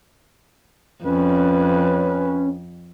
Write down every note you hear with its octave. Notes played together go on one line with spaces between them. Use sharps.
F2 C#4 B4